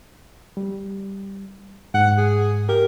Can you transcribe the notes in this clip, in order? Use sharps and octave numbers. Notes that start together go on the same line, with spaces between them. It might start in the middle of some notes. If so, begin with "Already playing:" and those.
G3
G#2 F#5
G#4
G4 A#4